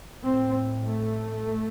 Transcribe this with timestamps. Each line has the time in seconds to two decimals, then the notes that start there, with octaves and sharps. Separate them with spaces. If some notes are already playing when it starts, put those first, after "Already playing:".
0.23 A2 C4
0.85 A3